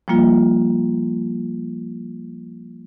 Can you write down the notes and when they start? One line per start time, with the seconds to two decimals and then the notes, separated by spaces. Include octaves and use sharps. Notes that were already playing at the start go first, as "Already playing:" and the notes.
0.08 F3 G3 A#3 F4